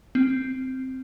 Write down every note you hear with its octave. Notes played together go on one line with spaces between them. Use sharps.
C4